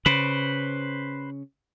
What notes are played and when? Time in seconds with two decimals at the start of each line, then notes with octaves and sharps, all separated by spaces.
0.06 C#3 B4 C5